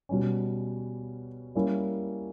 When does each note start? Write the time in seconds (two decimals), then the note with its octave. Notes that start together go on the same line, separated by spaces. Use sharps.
0.09 B2 G3 C#4
1.55 G3 A#3 C#4 E4